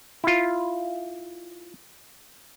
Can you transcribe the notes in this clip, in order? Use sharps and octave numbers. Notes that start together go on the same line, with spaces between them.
E4 F4